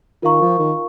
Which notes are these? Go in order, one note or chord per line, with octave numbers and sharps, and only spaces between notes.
D#3 F4 A#4 F5 A#5 C#6
F3
D#3